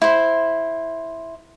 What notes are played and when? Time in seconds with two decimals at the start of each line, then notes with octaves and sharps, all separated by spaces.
0.02 E4 C5